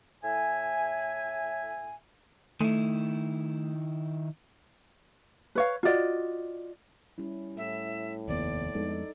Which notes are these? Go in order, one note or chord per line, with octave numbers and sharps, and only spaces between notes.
A2 E5 G#5
D#3 A3 E4
B4 C#5 F5
F4 F#4 D5 D#5
G3 C#4 E4
A2 E5
F1 D#2 B3 D5
F2 G#3 B3 D#4 A4